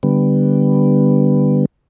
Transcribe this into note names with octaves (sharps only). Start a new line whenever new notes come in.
D3 G3 B3